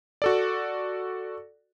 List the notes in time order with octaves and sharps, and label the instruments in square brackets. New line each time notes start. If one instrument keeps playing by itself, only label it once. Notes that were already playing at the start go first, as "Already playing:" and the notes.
[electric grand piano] F#4 A4 D5